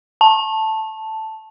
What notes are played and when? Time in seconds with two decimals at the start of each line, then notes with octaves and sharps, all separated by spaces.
0.21 A5